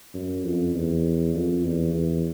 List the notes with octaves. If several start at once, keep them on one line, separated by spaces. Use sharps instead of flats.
F#2
F2
E2
F2
E2
E2